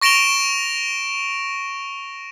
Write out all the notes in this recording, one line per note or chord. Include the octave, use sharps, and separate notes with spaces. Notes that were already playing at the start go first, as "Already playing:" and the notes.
C#6 A#6 D7 E7 F7 G7